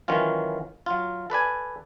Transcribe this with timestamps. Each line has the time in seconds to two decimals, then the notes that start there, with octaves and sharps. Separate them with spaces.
0.08 D#3 E3 F#3 C#4 F4
0.86 F#3 F4
1.30 A4 B4 D5 G#5